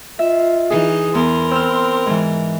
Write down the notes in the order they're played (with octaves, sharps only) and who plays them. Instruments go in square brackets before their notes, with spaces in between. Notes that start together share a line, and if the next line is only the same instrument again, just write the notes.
[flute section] F4 D#5 [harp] E5
[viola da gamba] E3 D#4 [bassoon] G#4
[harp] E2 [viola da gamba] A#4 [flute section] B5 C6
[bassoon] C4 [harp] E6 F6
[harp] G#2 E3